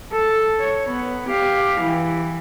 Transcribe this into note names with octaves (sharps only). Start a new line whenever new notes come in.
A4
C#5
B3
G4 F5
E3